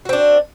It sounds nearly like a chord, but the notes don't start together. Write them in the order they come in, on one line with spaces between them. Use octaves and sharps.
F#4 C4 D4